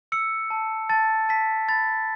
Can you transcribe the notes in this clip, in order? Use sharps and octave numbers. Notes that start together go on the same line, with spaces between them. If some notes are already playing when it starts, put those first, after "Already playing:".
E6 C#7
A5
A5 A6
A5 B6
B5 A6